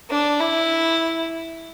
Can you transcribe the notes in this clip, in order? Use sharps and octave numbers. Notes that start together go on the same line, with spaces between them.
D4
E4